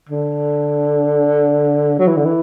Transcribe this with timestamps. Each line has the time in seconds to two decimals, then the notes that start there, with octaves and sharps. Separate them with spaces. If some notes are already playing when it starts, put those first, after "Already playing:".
0.09 D3
1.99 F#3
2.07 E3
2.17 D3
2.25 E3